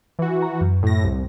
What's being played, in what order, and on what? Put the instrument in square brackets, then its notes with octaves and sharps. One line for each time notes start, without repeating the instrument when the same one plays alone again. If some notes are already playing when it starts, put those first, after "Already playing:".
[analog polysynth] E3 F#4
[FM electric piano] A#5
F#2
[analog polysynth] A2 A#6
C2